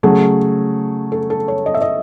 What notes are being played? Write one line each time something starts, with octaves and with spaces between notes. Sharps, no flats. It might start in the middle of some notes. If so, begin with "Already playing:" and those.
C#3 F#3 A3 G#4
A4
A4
C#5
D#5
E5
D#5